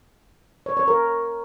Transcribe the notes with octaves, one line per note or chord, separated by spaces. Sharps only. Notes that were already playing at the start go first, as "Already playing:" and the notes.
C#5
C#5
A#4